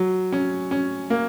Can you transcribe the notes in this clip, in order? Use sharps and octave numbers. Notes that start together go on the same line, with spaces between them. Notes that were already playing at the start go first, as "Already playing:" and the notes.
Already playing: F#3
C#4
C#4
A#3